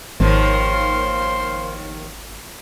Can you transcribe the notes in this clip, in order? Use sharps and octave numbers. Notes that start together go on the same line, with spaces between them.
G#1 D#2 D#3 F3 C5 F5 C6